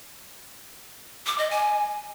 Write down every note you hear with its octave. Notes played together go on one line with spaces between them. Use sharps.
D6
D#5
G#5